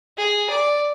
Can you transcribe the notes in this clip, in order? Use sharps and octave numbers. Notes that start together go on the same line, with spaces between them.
G#4
D5